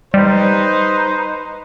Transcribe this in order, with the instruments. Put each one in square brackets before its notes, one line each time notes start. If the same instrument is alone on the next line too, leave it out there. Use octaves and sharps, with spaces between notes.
[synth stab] G3 [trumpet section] D#4 B4 C5